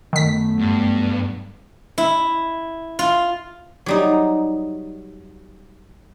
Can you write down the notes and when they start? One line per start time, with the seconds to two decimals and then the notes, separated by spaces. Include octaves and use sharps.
0.13 F#2 D#3 A3 B3 B6
0.59 G2
1.98 E4
2.99 F4
3.86 F#3 G3 D#4